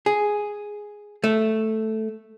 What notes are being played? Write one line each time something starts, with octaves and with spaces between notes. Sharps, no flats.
G#4
A3